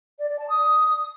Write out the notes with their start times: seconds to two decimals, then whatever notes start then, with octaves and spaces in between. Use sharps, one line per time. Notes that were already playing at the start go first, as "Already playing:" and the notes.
0.18 D5
0.29 D5
0.39 A5
0.49 D#6